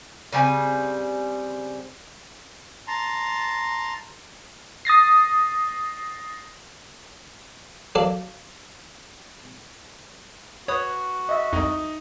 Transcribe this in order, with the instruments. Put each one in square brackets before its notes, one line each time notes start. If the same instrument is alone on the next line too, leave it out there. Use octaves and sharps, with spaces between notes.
[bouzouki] C#3 G3 C4 G#5
[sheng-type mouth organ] A5 A#5 C6
[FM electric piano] D#6 A6 A#6 C7
[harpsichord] F#3 A4 D5 F5
[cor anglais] F#4 [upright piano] B4 [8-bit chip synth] C#5 D#6
[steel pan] D#5 E5
[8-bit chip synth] C2 F2 [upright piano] D#4